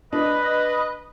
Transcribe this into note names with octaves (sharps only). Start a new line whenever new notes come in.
D4 B4 D#5